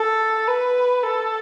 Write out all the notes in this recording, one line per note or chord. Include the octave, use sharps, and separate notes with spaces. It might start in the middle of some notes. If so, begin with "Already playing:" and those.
Already playing: A4
B4
A4